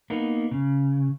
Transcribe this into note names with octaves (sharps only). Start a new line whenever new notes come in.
A#3 B3 D#4
C#3